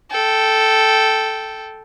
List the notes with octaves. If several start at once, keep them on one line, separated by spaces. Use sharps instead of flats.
A4 G5